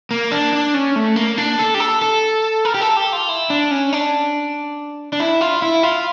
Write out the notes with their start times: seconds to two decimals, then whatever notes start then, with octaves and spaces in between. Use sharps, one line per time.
0.11 A#3
0.31 D4
0.53 D4
0.74 C#4
0.96 A3
1.16 A#3
1.38 D4
1.59 A4
1.74 G4
1.80 A4
2.02 A4
2.65 A#4
2.74 G4
2.81 A4
2.97 G4
3.13 F4
3.29 E4
3.50 D4
3.71 C#4
3.93 D4
5.13 D4
5.20 E4
5.41 F4
5.62 E4
5.83 F4